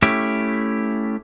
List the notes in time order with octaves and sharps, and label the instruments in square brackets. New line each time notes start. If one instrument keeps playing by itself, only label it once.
[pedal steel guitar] A3 C#4 E4 G4